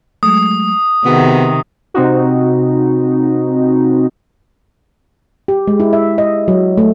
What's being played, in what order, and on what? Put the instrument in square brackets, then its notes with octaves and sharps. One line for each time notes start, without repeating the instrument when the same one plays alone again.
[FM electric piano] F#3 G#3 A3 [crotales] D#6
[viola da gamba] C3 D#3 [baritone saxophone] B3 [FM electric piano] F#4 G#4 F#5
[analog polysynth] C3 C4 D#4 F#4
[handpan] G4
G#3
E4
E5
D#5
F#3
A3